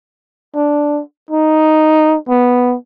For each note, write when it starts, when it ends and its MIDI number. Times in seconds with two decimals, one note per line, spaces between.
0.55 1.02 62
1.31 2.17 63
2.28 2.76 59